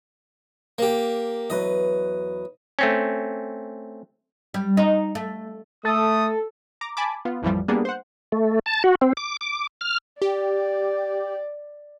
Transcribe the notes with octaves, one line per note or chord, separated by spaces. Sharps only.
A#3 G4
E2 F#3 B4 D#5
A3 C4 C#4
G3
D#4
A3
A3 A4 D#6
A#5 D6
G#5 A5 B5 D6
B3 F4
A1 F2 E3 F3 G3
G3 A#3 B3 D4 G#4
C5 F#5
A3
A5
F#4
C4
D6
D6
F6
G4 D5